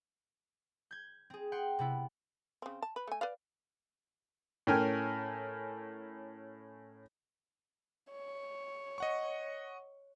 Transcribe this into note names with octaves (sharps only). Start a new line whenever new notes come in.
G6 G#6
C4 G#4
F#5 G5 C6
C3 B3 E4
C#3 C4
A5
B4
A3 G#5
B4 D5 F5
A2 C#4 A#4 G5 G#5 F6
C#5
D#5 F#5 C#6